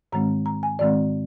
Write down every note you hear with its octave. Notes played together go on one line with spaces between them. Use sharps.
G#2 D#3 G#3 C4 A#5
A#5
G#5
G#2 D#3 G#3 C4 D5